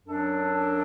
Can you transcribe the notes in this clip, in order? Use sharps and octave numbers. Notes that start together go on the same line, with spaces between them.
F#2 F#3 D4 A4